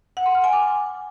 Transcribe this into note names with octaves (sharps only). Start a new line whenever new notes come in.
F#5
C6
F6
G#5
D6